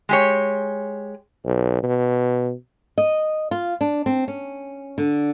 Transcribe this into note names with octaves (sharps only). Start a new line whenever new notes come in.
G#3 G4 C#5
B1
B2
D#5
F4
D4
C4
C#4
D3